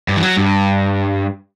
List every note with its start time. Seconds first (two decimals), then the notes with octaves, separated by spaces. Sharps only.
0.08 G2
0.17 E3
0.23 F#3
0.37 G2